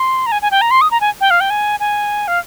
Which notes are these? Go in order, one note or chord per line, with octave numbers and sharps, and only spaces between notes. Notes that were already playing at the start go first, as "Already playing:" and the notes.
Already playing: C6
A#5
G#5
G#5
G5
A#5
C6
D#6
A#5
G#5
G5
F5
G5
G#5
G#5
F5